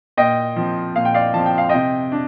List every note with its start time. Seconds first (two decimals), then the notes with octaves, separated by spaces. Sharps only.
0.17 A#2 D#5 G5
0.56 F3 C4
0.95 A#2 F5
1.05 G5
1.14 D5 F5
1.34 F3 C4 A5
1.46 G5
1.58 F5
1.69 C3 D#5 G5
2.12 D4